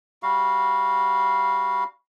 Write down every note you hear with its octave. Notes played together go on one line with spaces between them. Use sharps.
G3 F#4 F5